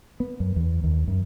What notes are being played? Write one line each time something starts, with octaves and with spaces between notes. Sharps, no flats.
B3
F#2
E2
D#2
F#2